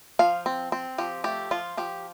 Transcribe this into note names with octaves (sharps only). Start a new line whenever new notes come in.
F3 F5
C4
C4
F3 G4
A3 G4
F3 F4
F3 G4